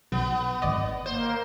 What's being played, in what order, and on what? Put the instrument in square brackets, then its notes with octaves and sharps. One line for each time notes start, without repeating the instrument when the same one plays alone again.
[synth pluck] B1 [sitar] B3
[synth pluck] G#1 D5 D#5
[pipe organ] A#3 [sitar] C5